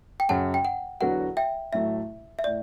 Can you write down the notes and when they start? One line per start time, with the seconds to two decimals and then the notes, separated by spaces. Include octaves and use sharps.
0.20 G5
0.29 F#2 C#3 F#3 C#4 F#5 A5
0.54 G5
0.65 F#5
1.01 E2 D3 F#3 B3 F#4 F#5
1.37 E5 G5
1.73 A1 A2 F#3 A3 E5
2.39 E5
2.44 A2 D5